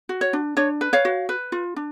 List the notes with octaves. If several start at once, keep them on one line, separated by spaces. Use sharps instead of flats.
F#4
C#5
D4
D4 C#5
B4
C#5 F5
F#4
B4
F4
D4